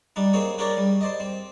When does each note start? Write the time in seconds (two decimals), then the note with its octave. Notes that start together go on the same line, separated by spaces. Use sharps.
0.16 G3 D4 D#4
0.33 A#3 C4 D#4 G#4 C#5
0.58 D4 G4 G#4 A#4 C#5 D5
0.77 G3
1.01 C5 D5 D#5
1.20 C4